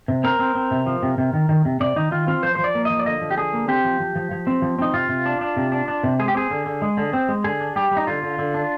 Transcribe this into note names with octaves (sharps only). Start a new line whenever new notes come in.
C3
C4 A#4
C4
C4
C3
F3
C3
C3
D#3
D#3
C3
C3 D5
D#3 D#4
D#3 F4
C4 F4
F3 C5
F3 C5
D5
A#3
D#5
F3
D5
D3 D#5
F3
G4
D3 G#4
A#3
C4 G4
F3
F3
F3
F3
C4
F3
C4 D#4
C3 F4
C3
D4
D4
C3
D4
D4
C3
G#3 G#4
G4
C4 G#4
D3
D3
G#3
D3
C4
G#3
D3 G#4
D4
G3 G4
G3
D#4
D3 F4
D3
D3
D4